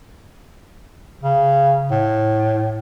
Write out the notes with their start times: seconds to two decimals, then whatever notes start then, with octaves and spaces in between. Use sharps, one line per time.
1.23 C#3
1.91 A2